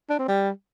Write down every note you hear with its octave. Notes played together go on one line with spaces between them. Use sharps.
D4
C4
G3